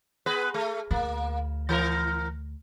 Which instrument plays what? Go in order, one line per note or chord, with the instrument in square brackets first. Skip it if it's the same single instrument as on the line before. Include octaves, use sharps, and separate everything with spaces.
[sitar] B3 G#4 B4
A3
[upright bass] D2 [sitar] A#3
[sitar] E3 A#4